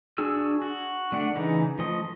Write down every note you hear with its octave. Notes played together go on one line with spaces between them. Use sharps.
D4 F#4 G#4 E6
F#4
D3 A3 D4 F#5
C#3 E3 D#4
F3 A3 D#5